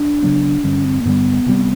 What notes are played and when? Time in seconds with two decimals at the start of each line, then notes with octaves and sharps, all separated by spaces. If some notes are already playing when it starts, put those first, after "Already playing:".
Already playing: D4
0.22 C#3 F#3 B3
0.64 G2 D3 G3 C#4
0.84 C4
1.01 A#3
1.05 G2 D3 G3 B3
1.46 C3 E3 G3 C4